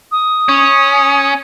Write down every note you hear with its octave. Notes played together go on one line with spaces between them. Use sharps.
D#6
C#4